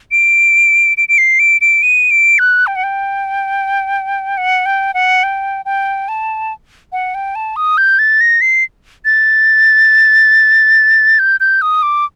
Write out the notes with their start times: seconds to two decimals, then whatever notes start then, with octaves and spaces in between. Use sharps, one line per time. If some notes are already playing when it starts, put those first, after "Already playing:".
0.12 D7
0.97 D7
1.09 D7
1.18 C7
1.39 D7
1.61 D7
1.83 D#7
2.11 D7
2.39 F#6
2.67 G5
2.76 F#5
2.83 G5
4.37 F#5
4.66 G5
4.94 F#5
5.23 G5
5.65 G5
6.08 A5
6.92 F#5
7.15 G5
7.35 A5
7.56 D#6
7.78 G6
7.99 A6
8.21 A#6
8.41 C7
9.05 A6
11.19 G6
11.40 G6
11.62 D#6
11.83 D6